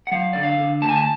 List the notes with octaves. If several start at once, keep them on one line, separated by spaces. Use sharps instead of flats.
F#5
F#3 F5
D3 D5
F5
D3
D2 A5
G#5
A5